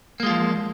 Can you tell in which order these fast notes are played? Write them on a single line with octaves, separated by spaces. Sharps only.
A#3 G#3 F4 F3